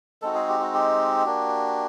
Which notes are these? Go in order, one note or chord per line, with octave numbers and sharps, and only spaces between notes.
G#3 C4 D#4 F#4 A4
G#4
G4
F#4
G4
A#3 D4 F#4